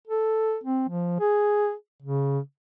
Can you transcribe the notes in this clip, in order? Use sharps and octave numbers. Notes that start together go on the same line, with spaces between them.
A4
C4
F3
G#4
C#3